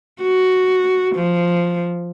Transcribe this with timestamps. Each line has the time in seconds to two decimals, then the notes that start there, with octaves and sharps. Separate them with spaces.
0.22 F#4
1.16 F3